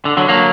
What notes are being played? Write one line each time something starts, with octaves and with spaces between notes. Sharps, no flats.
D3
D3 F#3
F#3 A#3